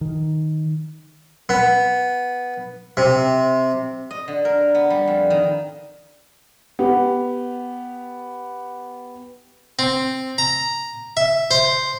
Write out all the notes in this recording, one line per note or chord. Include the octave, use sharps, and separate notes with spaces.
D#3
B3
C3
D#5
D3
A#4
B3
G3
F2
D#3
B3 G4
C4
A#5
E5
C5